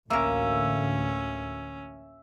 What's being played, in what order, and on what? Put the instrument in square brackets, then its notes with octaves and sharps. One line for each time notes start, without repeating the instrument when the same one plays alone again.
[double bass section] A1 D2 [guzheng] A#3 A#4 [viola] C#4 [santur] E5